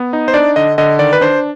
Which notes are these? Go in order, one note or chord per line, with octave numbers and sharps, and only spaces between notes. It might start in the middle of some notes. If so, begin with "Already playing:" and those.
Already playing: B3
D#4
C5
D4 D5
D3 D#5
D3 D#5
D#3 D5
B4
D4 C5